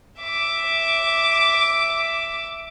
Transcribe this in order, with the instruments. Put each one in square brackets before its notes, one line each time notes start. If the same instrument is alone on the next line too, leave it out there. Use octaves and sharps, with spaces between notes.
[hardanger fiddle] E5 D6